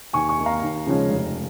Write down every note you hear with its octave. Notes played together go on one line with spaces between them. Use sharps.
D#2 G#5 C#6
G#5 C#6
D#3 A#3
F5 A#5
D#2
C#3 F3 G#3 C#4
F1